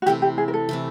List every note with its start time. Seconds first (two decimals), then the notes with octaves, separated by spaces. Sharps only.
0.02 F#4
0.06 C3 E3 A3 G4
0.22 G4
0.38 G#4
0.48 A#4
0.54 A4
0.69 C3 E3 A3